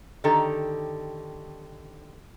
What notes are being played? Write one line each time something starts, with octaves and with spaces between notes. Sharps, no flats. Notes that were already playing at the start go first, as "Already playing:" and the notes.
D3 D#3 G4 A4 A#5